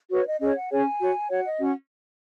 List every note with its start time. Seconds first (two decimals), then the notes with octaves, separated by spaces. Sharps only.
0.10 F#4 B4 C#5
0.26 D#5
0.40 C#4 G#4 C#5 D#5
0.55 F#5
0.70 C#4 G#4 C#5 G#5
1.01 F#4 C#5
1.29 F#4 C#5 F#5
1.45 D#5
1.59 C#4 F#4 F#5